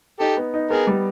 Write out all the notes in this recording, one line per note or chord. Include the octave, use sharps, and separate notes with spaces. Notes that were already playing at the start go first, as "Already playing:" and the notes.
D#4 G4 A4
B3
D#4
B3 G#4 A#4
G3